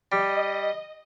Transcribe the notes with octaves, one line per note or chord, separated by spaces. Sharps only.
G3 D#5